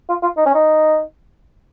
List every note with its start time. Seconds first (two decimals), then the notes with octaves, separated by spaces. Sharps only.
0.09 F4
0.23 F4
0.37 D#4
0.46 C#4
0.55 D#4